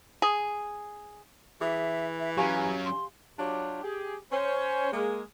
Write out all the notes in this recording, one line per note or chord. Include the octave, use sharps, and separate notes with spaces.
G#4
E3 G#4 E5 D#6
E5
F#3 C#4 G4 F5 G#5 A#5
C6
F#3 D4 F4 G4
G4 G#4
C#4 C5
G#3 A#3